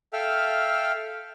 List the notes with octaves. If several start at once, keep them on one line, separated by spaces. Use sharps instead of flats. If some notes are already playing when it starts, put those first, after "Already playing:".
A4 E5 F5 G5 F6